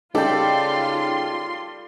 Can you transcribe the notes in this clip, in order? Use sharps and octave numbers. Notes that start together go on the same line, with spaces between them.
C#3 G3 D#4 F4 A4 D5 G5 C6